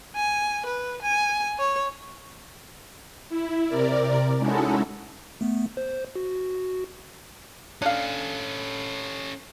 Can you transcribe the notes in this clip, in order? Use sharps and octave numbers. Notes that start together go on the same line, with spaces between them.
G#5
B4
G#5
C#5
E4
C3 A#4 D5
G#3 C#4 D#4 E4 F#4 A4
A3 B3
C5
F#4
C#4 D4 A4 F5